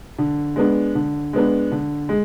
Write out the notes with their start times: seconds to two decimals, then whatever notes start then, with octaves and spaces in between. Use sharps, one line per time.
0.18 D3
0.56 G#3 B3 D4
0.95 D3
1.33 G#3 B3 D4
1.72 D3
2.09 G#3